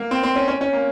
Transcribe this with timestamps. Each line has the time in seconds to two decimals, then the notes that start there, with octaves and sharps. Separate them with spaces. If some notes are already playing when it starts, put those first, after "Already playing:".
Already playing: A#3
0.11 C4
0.23 C4
0.36 C#4
0.48 C#4
0.61 C#4
0.73 A#3